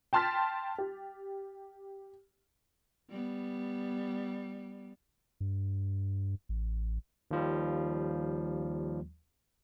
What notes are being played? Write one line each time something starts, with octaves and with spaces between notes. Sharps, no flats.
G5 A5 C6 F6 A6 B6
G4
G3 B3
G2
A1
D#2 F3 G3